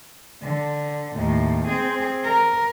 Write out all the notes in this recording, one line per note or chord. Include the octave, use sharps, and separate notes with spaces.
D3
D#2 A2
C4 G#4
A#4